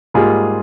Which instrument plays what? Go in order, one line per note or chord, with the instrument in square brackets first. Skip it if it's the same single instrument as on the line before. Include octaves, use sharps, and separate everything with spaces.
[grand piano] G#2 G3 A#3 F4 G#4